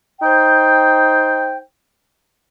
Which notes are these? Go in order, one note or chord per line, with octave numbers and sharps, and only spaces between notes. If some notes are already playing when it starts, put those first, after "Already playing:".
D#4 C5 G5